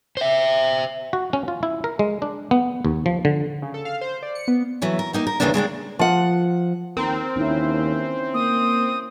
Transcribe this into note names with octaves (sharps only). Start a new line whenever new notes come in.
C5 E5
F#4
C#4
F4
E4
A#4
G#3
D4
B3
D#2
F3
D3
C#3
A4
F5
C5
D5
C#7
B3
E3 F#3 A3
A#4
A#3 D#4 G4
A#4
D#2 A2 C#3 E3 A#3 D4
C#3 G#3 D4 G4
F3 F#5
D#2 C4 A#4
D#2 C#4 E4
A#3 D#6